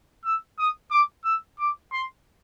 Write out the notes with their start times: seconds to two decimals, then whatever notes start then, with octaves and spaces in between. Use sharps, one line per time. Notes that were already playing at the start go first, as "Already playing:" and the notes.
0.25 E6
0.58 D#6
0.91 D6
1.25 E6
1.59 D6
1.93 C6